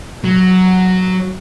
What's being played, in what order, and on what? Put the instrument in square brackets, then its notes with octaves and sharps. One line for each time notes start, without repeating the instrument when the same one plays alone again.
[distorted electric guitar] F#3